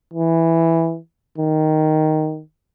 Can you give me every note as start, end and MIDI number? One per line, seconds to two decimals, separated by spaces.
0.14 0.98 52
1.38 2.41 51